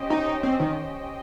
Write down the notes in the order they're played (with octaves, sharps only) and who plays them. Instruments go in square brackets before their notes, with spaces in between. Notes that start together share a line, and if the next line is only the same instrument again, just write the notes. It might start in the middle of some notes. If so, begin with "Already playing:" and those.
Already playing: [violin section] C#4 G4 C5 D#5 G5
[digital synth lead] D#4
C4
D#3